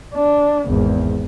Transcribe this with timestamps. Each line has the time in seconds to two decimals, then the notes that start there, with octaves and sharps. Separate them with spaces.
0.15 D4
0.67 G#1 E2